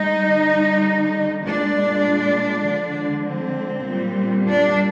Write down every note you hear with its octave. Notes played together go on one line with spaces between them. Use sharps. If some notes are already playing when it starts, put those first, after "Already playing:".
Already playing: G#3 D#4
D3 G3
A#2 G#3 D4
D3 F3 G#3
C4
A#2 G3
D4